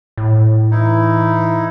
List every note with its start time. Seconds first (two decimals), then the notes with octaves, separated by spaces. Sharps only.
0.17 A2
0.71 E3 D#4 E4